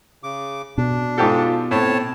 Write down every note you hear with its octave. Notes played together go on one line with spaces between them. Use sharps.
C#3 D6
B2 D4
G#2 F4 G4 A4
A2 C4 C#5 A5